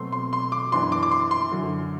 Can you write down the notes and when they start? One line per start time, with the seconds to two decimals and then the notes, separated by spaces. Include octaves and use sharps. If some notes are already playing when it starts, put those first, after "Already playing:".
Already playing: B2 F#3 A3 C4 C6
0.12 C6
0.33 C6
0.52 D6
0.72 F#2 E3 B3 D4 C6
0.92 D6
1.03 D6
1.11 C6
1.31 C6
1.51 F#2 D3 F#3